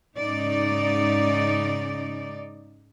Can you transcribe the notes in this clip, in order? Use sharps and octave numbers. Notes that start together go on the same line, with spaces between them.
G#2 C#3 D#4 D5